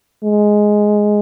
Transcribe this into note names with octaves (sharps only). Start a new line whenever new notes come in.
G#3